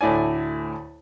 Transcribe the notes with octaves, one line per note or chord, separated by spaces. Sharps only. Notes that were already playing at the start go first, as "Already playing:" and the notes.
D2 A2 E4 D5 G#5